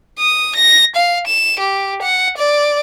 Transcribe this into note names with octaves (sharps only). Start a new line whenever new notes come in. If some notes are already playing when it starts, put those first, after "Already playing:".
D#6
A#6
F5
E7
G4
F#5
D5